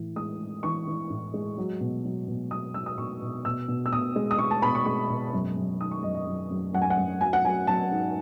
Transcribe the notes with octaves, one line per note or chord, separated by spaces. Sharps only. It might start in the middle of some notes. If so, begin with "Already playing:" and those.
Already playing: A2 E3
G#3 D#6
G#3
E3 C#6
E3
A2
G#3
F#3
B2
F#3
B2
F#3 D#6
F#3 E6
D#6
B2 C#6
B2
B2 E6
B2
E6
B2 D#6
G#3
D#6
G#3 C#6
A5
B2 B5
C#6
G#3 C#6
B2
F#2
F#2
D#3 D#6
C#6
F#2 D#5
D#5
F#2
F#2
F#2 F#5
G#5
F#5
F#2
F#3 G#5
F#5
F#3 G#5
F#3 A5
G#2